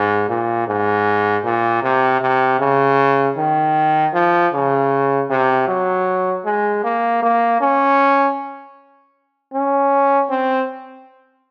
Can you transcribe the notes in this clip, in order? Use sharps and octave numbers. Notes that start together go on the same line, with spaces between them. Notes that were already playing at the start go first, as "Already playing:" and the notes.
Already playing: G#2
A#2
G#2
A#2
C3
C3
C#3
D#3
F3
C#3
C3
F#3
G#3
A#3
A#3
C#4
C#4
C4